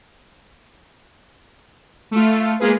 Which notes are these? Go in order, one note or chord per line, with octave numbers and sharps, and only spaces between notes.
A3 F4
G#3 A#3 F4 G#4 B4